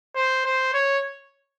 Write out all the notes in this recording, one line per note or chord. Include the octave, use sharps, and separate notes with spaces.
C5
C5
C#5